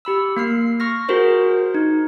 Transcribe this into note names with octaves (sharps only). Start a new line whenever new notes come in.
G4 B5 E6
A#3 F6 C7
C#6 F6 A#6
F#4 G#4 A#4 C5
D#4